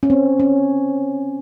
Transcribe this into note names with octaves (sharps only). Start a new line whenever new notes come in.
C#4
C4
C#4